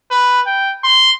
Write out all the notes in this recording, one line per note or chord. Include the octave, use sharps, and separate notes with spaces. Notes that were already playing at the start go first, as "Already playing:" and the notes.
B4
G5
C6